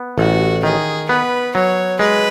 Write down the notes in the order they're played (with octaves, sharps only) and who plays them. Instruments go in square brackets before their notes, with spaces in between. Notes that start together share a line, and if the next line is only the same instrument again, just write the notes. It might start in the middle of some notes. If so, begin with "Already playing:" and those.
Already playing: [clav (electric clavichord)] B3
[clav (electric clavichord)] A1 [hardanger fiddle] F#4
[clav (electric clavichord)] D#3 [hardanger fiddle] G#4
[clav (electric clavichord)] B3 [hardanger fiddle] B4
[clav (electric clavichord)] F#3 [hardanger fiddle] C#5
[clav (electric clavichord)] G#3 [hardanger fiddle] B4